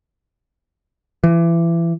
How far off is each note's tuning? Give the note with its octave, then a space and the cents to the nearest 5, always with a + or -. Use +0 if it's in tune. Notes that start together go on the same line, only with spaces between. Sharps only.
E3 +30